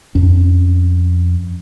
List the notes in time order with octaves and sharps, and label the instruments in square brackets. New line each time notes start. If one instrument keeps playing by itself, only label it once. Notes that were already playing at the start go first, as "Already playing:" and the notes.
[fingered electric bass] F2 C#4